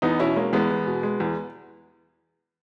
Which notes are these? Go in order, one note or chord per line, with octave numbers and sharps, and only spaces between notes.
E2 B3 D#4
B2 C#4 E4
G#3 A#3 C#4
E2 G#3 B3
E2
B2
G#3
E2